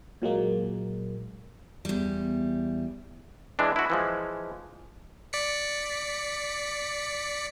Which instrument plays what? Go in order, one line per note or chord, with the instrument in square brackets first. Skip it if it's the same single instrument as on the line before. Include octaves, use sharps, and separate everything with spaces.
[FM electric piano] A#2 F#3 G#3 A#3
[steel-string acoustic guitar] E2 G3
[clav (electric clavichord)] E3 G#3 D4
E4 F#4
E3 F3 G#3
[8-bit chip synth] D5 B6 C#7